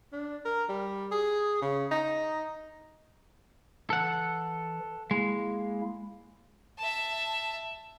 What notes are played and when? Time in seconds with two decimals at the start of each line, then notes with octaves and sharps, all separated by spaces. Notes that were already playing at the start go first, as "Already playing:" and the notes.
0.13 D4
0.45 A#4
0.69 G3
1.12 G#4
1.62 C#3
1.91 D#4
3.90 E3 A4 F#5
5.11 G#3 A#3 E4
6.78 E5 A5